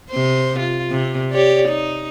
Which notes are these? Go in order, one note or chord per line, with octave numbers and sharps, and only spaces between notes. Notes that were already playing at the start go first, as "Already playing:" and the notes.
C3 C5
F4
C3
G4 C#5 D5
D#4